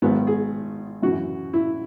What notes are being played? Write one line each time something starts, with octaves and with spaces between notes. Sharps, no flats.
G#1 G#2 D#3 F#3 B3
G#4
F#2 C#3 E3 F#4
E4